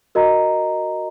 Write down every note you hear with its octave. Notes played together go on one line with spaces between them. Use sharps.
F#4 A#4 D#5 A#5